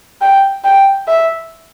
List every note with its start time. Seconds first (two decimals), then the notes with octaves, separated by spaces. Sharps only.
0.21 G5
0.64 G5
1.08 E5